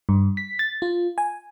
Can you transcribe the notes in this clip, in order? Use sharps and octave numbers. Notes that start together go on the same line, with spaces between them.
G2
B6
A6
F4
G#5